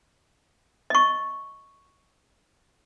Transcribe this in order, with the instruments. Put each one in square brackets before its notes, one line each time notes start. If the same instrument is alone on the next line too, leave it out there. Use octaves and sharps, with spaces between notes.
[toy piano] D#5 C#6